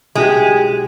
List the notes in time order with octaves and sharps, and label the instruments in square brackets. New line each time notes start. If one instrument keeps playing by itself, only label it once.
[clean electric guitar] B1 F#4 G4 [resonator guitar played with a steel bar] G#3